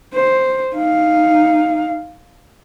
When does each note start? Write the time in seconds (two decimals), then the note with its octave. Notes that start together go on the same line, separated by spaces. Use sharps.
0.14 C5
0.75 D#4 F5